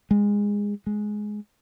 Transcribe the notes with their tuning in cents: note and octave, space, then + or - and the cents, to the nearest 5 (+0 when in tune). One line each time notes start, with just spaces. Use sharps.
G#3 -20
G#3 +10